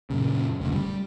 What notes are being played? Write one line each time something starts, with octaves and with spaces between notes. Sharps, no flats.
F#2 A#2 C#3
F1 D2 C#3
G3